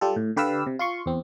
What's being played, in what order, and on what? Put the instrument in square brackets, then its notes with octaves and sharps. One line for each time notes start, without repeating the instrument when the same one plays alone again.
[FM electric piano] G3 F4 G4 A4
A2
D3 G4 B4 D5 F5 E6
C3
F4 C6 C#6
E2 C4